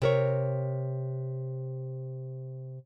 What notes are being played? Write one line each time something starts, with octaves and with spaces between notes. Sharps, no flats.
C3 A#4 C#5